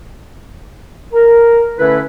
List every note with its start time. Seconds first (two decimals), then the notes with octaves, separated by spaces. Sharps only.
1.13 A#4
1.78 D3 A3 C#4 E4 A4 B4